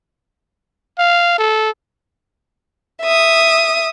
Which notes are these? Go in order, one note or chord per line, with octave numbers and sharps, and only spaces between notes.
F5
A4
E5 D#6